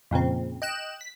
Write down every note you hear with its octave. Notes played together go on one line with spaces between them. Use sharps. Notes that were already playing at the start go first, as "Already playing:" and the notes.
F2 A#2 C#3 C4
D#5 G5 F#6 E7
B6